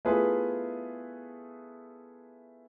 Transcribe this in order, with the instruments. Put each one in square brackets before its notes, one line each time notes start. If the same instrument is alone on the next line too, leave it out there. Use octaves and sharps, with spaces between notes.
[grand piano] A3 B3 E4 F4 G#4 B4